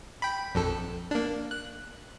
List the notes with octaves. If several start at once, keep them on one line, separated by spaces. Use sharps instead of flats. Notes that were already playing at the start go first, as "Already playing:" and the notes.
G5 B5
A#1 F2 A4
A#3 D4
F#6